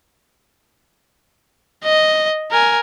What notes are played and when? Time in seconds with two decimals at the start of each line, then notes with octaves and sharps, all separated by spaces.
1.84 D#5
2.52 A#4 G#5